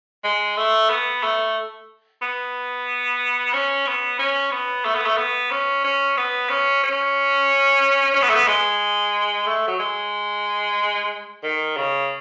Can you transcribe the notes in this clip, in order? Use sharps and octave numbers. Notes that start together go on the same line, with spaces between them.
G#3
A3
B3
A3
B3
C#4
B3
C#4
B3
A3
B3
A3
B3
C#4
C#4
B3
C#4
C#4
C#4
B3
A3
B3
G#3
A3
F#3
G#3
D#3
C#3